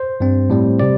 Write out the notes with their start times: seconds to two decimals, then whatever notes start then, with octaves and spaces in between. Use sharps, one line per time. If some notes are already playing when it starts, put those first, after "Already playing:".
Already playing: C5
0.20 G2 G3 C4
0.50 A2 G3 C4
0.80 C3 G3 D5